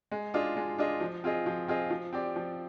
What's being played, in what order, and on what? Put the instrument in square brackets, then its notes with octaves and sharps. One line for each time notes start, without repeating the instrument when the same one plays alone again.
[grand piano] G#3
D4 F4 G#4 D#5
G#3
D4 F4 G#4 D#5
F3
C4 F4 G#4 D#5
F3
C4 F4 G#4 D#5
F3
C4 G4 D5
F3